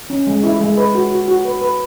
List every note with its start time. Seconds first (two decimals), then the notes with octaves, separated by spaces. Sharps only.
0.10 C#4
0.27 G#3
0.44 E4
0.60 G#3
0.77 B4
0.95 F#4
1.12 F#4
1.28 F#4
1.45 B4
1.62 B4